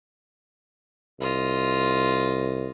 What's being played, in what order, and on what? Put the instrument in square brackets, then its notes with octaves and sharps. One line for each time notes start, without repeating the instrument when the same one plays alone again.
[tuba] C2 [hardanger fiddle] F4 D#5